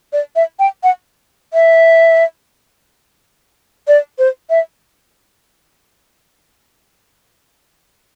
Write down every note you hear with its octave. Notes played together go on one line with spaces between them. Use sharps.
D5
E5
G5
F#5
E5
D5
C5
E5